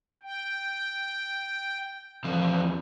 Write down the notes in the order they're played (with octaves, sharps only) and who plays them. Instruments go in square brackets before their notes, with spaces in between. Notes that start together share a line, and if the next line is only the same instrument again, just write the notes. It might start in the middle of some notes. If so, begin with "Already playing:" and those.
[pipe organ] G5
[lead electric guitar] E2 F3